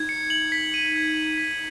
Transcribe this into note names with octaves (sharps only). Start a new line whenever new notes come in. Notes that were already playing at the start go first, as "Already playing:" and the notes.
Already playing: D#4 G#6
C#7
F#7
B6
D#7
G#6
F#7
B6